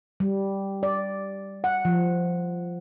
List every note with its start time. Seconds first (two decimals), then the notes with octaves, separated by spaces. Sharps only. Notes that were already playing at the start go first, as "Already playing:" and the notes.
0.20 G3
0.83 D5
1.64 F#5
1.85 F3